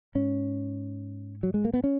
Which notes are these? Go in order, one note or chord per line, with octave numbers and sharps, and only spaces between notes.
G#2 C#4
F#3
G#3
A#3
B3
C#4